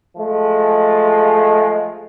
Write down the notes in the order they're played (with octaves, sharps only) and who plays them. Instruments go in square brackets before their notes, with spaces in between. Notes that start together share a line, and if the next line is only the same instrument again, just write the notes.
[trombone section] F3 G#3 A3